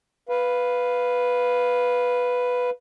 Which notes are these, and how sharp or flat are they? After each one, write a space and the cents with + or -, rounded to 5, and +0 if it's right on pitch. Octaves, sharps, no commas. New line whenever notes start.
B4 +0 F5 +0